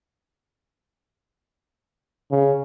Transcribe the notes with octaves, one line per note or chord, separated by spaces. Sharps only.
C#3